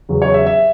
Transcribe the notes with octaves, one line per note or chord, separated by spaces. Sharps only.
E2 C#3 F#3
C#5
E5
E5